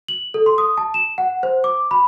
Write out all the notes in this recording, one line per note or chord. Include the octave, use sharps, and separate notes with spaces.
F#7
A4
C6
D#6
A5
E7
F#5
C5
D6
B5